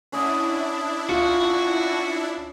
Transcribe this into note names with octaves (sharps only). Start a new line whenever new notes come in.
C#4 D4 E4 D#5 F#5
F4 F#4